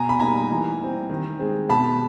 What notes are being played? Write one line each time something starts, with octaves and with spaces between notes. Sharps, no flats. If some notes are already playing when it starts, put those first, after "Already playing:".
Already playing: B2 G#5 A#5
B5
G3 A#3 D#4 G#5 A#5
E3
G3 C4
D#3
G#3 C4
B2 A5 B5